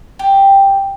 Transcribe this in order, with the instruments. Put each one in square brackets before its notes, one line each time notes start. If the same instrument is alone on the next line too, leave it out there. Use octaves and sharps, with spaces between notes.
[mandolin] G4